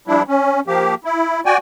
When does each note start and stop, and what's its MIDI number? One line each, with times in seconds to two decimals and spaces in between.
0.08 0.22 53
0.08 0.22 55
0.08 0.22 62
0.08 0.22 64
0.28 0.60 61
0.67 0.95 53
0.67 0.95 58
0.67 0.95 67
1.05 1.41 64
1.46 1.57 66
1.46 1.57 74
1.46 1.57 79
1.46 1.57 80